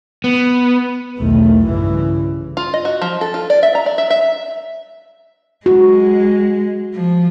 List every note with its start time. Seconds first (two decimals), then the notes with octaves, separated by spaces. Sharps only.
0.24 B3
1.19 B1 E2 D#3 A3
1.65 G2 C#3 E3
2.57 F4
2.74 D#5
2.85 F#4
3.02 F3
3.21 A4
3.34 F4
3.50 D5
3.63 E5
3.75 A#5
3.86 D5
3.98 E5
4.10 E5
5.66 G#3 F#4
6.94 F3